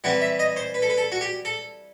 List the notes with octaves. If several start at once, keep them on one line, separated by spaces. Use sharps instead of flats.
E3 G3 C4 F#5
E5
D#5
C5
B4
A4
B4
A4
F#4
G4
A4